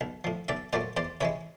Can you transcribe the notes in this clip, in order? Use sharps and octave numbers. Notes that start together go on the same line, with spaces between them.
B1
A2 F3
B1 D5 E5
A#2 F#3 A3 C5 D5
E2 C5 D5
C3 E3 G#3 B4 C#5